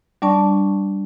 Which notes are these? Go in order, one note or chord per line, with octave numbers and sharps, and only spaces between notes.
G3 D4 D5 A5 C#6